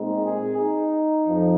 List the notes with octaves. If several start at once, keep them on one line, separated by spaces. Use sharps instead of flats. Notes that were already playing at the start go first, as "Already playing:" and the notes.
Already playing: A#2 G#3 C4 D#4
G#4
D#4
F2 F3